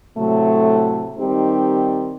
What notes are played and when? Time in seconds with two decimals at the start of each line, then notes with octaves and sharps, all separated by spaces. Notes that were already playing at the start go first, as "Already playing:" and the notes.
0.18 A2 C3 F#3 A3
1.19 D#3 G3 C4 D#4 G4